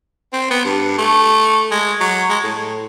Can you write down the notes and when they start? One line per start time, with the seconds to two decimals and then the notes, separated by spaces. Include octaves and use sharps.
0.33 C4
0.50 B3
0.65 G2
0.98 A3
1.71 G#3
2.00 F#3
2.30 G#3
2.44 A2